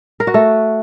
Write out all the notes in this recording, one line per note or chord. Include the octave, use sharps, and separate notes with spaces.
A#4
F#4
A3